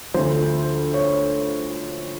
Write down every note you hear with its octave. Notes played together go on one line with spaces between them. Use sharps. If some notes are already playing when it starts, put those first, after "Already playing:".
D2 D3 F3 C5
C#5